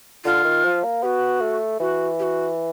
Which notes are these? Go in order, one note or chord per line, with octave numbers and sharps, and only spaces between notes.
D3 F4
D#3
F3
A#3
B3 F#4 G4
A3
E3 F#4
G4
F#4